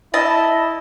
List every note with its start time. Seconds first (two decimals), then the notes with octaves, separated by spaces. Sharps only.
0.14 E4 D#5 A5